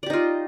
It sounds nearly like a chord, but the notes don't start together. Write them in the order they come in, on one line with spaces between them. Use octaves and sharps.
D5 G4 D#4 F4